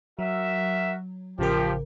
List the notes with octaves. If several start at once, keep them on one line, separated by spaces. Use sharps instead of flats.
F#3 F#4 A#4 E5
A1 C#3 F3 G4 A#4